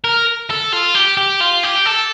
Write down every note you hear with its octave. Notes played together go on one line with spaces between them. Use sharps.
A#4
A4
F4
G4
G4
F4
G4
A4